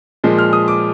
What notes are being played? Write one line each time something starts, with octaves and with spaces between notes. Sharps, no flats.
A#2 F3 G#3
F6
D#6
D6